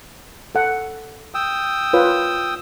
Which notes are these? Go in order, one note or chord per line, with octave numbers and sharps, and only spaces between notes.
A4 F#5
G5 D#6 E6
F4 B4 C#5